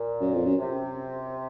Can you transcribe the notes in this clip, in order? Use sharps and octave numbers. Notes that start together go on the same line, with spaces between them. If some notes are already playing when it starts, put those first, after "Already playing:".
Already playing: A#2
F#2
F2
F#2
C3